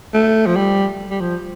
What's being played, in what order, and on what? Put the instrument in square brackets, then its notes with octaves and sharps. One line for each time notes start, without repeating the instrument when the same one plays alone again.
[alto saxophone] A3
F3
G3
G3
F3